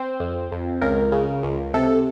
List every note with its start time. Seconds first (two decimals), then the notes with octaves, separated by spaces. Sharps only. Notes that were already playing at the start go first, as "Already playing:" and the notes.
Already playing: C4 C5
0.20 F2
0.52 F2
0.82 C#2 A#4
1.12 C#3
1.43 C#2
1.74 C3 A4